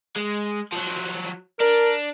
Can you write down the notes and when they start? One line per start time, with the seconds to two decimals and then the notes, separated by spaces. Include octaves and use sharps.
0.16 G#3
0.72 F3 F#3
1.60 D4 A#4